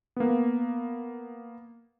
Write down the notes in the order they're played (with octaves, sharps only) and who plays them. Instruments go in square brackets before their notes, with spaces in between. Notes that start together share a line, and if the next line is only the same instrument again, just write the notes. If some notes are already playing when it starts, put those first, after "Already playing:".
[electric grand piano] A#3 B3